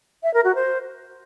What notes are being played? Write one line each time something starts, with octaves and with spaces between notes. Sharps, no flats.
E5
A#4
F#4
C5